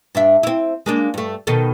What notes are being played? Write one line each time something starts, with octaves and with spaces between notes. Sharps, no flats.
G2 D4 E5
C4 E4
G#3 A#3 D4
G2 A3
B2 D#3 A4